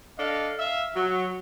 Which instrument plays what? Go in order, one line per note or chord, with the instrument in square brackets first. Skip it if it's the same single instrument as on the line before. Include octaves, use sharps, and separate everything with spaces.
[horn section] D4 A4 D#5 F5
E5 F5
F#3